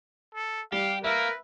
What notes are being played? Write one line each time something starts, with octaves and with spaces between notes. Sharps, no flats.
A4
G3 G4 F5
A#3 A#4 B4 E5